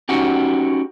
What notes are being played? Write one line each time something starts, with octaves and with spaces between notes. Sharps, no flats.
C#4 D#4 F#4 G4